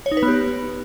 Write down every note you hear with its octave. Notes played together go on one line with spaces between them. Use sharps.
C#5
D#4
B4
B3
G4